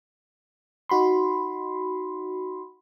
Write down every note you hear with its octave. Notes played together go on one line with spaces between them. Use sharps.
D#4 F#4 B5 C6